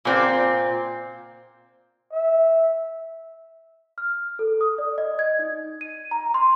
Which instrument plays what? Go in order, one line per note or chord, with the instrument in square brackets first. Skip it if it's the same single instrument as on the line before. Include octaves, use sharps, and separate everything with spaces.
[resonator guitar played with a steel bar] A#2 C4
[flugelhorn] E5
[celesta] F6
A4
D#6
D5
D#5
G#6
D#4
D#7
A#5
C6